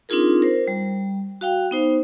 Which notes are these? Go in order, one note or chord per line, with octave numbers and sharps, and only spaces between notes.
C4 D4 D#4 F4 G#4 A#4
A#4 C5
G3
F#4 F5 G5
B3 D#4 C5